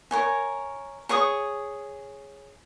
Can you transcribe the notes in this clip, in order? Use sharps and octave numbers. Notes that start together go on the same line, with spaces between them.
A#4 C#5 G#5
G#4 C#5 C#6 D#6